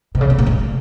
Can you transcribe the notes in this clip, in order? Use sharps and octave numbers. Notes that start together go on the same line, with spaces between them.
B2
C#3
B2
A#2
G#2